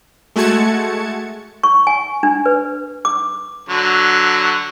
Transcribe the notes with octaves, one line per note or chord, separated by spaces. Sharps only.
G#3 A3 F#4 A5 G#6 C#7
C#6
G#5
D4
B4
D6
D3 F#3